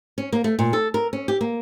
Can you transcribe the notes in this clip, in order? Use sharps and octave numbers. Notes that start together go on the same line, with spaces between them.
C#4
A#3
A3
A#2
A4
A#4
C#4
G4
A#3